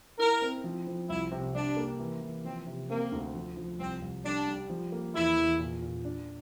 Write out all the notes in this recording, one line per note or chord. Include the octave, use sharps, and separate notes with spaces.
E4 A#4
C4
F3
F3
C2 E4
C3
G3 D4
A#3
E3
E3
F3 C4
C3
A#3 C4
D2
F3
F3
C2 C4
C2
G3 D4
G3
F3
A#3
E2 E4
E2
A#2
A#2
D4